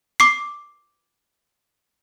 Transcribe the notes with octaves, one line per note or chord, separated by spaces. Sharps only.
D6 C7